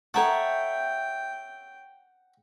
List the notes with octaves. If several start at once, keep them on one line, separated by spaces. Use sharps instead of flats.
A4 C#5 E5 F#5 G5 A5 A#5 C#6